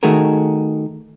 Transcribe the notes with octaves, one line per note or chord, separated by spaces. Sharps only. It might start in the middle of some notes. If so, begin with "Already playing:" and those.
D#3 A3 D#4 F#4 G#4 A#4